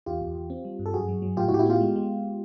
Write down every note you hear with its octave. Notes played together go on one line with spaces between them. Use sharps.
E2 F4 G4
E2
E2
C4
G3
G2
A4
F#2 F#4 G#4
F#3
F#3
A2 F4 G4
E4 F#4
A2 G4
E4 F#4
B3 F4 G4
G#3
G#3